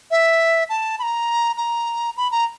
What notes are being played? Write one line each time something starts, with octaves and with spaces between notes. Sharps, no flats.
E5
A5
B5
A#5
A#5
B5
A#5